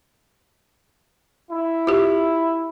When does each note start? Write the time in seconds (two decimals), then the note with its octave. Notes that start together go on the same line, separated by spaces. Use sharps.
1.51 E4
1.87 F4 G4